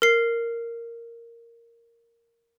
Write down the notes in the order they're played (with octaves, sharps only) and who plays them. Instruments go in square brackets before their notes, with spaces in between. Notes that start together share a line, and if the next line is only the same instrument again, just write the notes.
[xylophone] A#4 C7